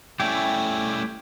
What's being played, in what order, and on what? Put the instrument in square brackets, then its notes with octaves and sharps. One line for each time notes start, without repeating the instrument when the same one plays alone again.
[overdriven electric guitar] G3 A3 [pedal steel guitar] C#4 E4 G4